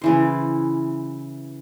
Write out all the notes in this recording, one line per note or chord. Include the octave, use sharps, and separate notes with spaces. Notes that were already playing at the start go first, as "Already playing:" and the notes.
C#3 E3 C5